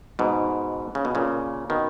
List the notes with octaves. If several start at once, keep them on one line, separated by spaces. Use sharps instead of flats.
G#2 B2
C#3
B2
A#2 C#3
B2 D#3